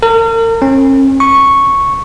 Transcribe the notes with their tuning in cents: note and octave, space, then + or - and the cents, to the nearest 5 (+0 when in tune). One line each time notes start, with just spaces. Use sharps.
A#4 -40
C#4 -45
C#6 -5